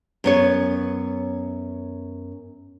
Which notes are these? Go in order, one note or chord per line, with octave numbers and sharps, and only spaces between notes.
F#2 B3 C#5